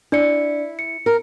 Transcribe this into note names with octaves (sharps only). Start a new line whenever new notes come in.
D4 E4 D5 C#7
C#7
A#4